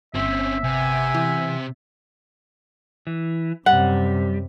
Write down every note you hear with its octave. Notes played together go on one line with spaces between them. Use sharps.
G1 C4 C#4 E5
C3 B3 G#5
E3
E3
F#2 C3 G3 F#5